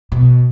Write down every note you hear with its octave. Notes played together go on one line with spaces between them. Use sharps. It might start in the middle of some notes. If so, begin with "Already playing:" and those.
B2